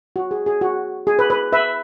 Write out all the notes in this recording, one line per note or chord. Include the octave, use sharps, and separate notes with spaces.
F#4
G#4
G#4
F#4
G#4
B4
B4
B4 E5